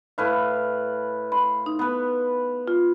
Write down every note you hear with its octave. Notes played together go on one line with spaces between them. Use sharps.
A2 B4 F5
B5 C6
D#4
B3 B4
F4